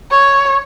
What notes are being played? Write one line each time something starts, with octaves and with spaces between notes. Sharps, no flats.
C#5